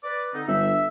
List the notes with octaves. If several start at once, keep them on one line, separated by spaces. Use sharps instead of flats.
B4 D5
D3 C4 D#4
G1 E5